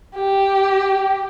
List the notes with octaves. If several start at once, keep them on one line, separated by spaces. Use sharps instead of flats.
G4